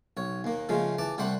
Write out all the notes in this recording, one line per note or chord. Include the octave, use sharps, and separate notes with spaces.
B1 C#5
D#2 A#3
C#3 F3 G#3 A3
E3 A5 D6
C2 G3 A3 C5 F#5 B5